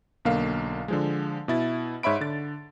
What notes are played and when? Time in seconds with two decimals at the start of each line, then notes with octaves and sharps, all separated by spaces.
0.25 B1 D3 A#3 F5
0.88 D3 F3 G#3
1.48 B2 E4 A6
2.03 G#2 C#5 E5 B5 D7
2.21 D3 A6